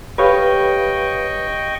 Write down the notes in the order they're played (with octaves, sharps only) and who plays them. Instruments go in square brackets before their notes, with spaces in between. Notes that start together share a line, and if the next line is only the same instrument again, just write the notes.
[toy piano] G4 A4 [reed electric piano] B4 C#5 F5 [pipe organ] D#5 G5 C#6